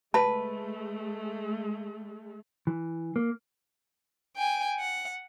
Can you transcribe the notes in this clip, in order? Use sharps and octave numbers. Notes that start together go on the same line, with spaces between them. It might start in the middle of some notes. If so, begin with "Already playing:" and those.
G#3 A3 B4 A5
E3
A#3
G5 G#5
F#5